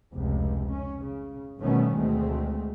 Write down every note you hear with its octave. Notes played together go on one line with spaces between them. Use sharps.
F1 C#2 C3
C#4
C#3
G1 B2 D#3 A3 B3 C#4
D2 B2 G#3 A3 C4